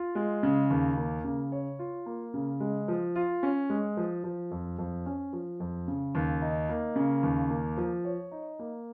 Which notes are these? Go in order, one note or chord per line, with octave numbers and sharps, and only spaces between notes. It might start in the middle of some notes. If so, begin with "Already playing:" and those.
Already playing: F4
G#3
C#3
D#2
A#3
C#3
C#5
F4
A#3
C#3
G#3
F3
F4
C#4
G#3
F3
F3
F2
F2
C#4
F3
F2
C#3
D#2
D#4
A#3
C#3
D#2
A#3
F3
C#5
D#4
A#3